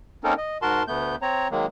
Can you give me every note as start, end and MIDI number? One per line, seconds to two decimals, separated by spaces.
0.24 0.34 58
0.24 0.34 60
0.24 0.34 61
0.24 0.34 63
0.24 0.34 69
0.24 0.34 70
0.38 0.58 75
0.62 0.83 44
0.62 0.83 66
0.62 0.83 70
0.62 0.83 81
0.62 0.83 84
0.88 1.16 38
0.88 1.16 57
0.88 1.16 59
0.88 1.16 91
1.22 1.48 60
1.22 1.48 73
1.22 1.48 82
1.51 1.66 51
1.51 1.66 54
1.51 1.66 56
1.51 1.66 58